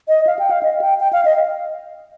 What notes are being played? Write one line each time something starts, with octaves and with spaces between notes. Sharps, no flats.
D#5
F5
G5
F5
D#5
G5
G5
F5
D#5